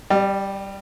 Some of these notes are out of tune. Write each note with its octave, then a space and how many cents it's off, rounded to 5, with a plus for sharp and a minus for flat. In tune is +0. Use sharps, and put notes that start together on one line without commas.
G3 +0 D5 +45